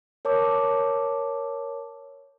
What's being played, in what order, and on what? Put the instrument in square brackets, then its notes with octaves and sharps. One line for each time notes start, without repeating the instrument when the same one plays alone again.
[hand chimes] A#4 C#5 A5 D6